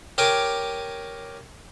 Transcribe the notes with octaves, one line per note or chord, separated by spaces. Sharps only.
G4 A#4 C#5 G#5 D6